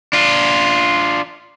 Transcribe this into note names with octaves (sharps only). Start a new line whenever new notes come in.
D4 F4